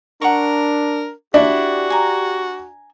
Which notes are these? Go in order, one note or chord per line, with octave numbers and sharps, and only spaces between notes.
D4 A#4 F#5 A#5 C#6
D4 E4 F#4 G4
G#5 A#5